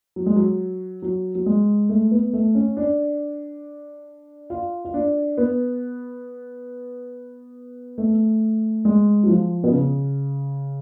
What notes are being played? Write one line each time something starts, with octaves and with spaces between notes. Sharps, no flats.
F#3
G#3
F#3
F#3
F#3
G#3
A3
B3
A3
C#4
D4
F4
F4
D4
B3
A3
G#3
F#3
F3
B2
C#3